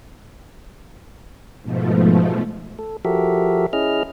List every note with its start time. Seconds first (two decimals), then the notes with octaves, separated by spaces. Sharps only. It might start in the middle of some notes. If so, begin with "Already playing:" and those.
1.62 G#2 B2 F3 A3
2.79 A4
3.05 F3 F#4 G4 A4 A#4 E5
3.73 C#4 E4 G#4 D#5 F6